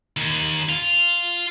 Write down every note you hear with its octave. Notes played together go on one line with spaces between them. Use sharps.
D#2
F4